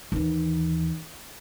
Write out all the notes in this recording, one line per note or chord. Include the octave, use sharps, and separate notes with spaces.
D#2 E3